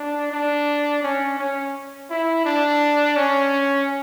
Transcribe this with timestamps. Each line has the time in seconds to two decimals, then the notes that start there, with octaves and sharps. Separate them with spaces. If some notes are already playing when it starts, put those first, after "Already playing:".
Already playing: D4
0.32 D4
1.03 C#4
1.39 C#4
2.10 E4
2.45 D4
3.17 C#4